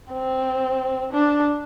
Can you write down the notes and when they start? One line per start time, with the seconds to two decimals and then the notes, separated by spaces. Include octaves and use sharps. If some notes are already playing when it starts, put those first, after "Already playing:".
0.12 C4
1.13 D4